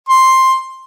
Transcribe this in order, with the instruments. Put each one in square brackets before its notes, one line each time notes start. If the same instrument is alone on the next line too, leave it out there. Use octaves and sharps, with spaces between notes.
[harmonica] C6